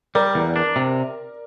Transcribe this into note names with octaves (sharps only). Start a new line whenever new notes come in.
G3 A#4 D5
E2
D4
C3